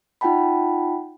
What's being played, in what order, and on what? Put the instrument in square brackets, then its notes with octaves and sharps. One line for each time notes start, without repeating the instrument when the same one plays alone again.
[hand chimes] D#4 F4 F#5 G5 A5 B5